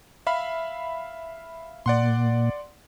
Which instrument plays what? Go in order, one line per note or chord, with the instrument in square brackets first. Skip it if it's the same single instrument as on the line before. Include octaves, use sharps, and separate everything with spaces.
[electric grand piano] E5 F5 B5
[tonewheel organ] A#2 [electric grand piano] D5 F#5 C6